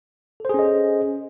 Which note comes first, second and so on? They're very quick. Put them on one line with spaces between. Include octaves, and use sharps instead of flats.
A4 C5 G#4 C#4 D#5